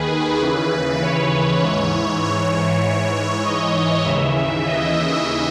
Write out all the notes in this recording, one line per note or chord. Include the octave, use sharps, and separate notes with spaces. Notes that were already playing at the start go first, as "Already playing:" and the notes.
Already playing: D#2 D#3 G#4 B4
D#2 C#3 E3
C#5
G#2 E3
C#5
G#2 E3
D#5
D#2 C#3 E3 E5
D#5